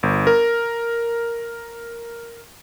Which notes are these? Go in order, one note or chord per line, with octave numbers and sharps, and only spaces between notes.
G1
A#4